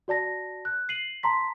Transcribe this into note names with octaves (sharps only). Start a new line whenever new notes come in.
F#4 D5 A5 A#6
F#6
C7 D#7 F#7
A5 A#5 C6 B6